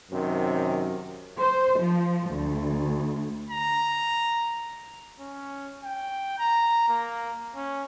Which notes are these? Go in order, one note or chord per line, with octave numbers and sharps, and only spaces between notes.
F#2 C3 D#3 C4
C5
F3
D2
A#5
C#4
G5
A#5
A#3
C#4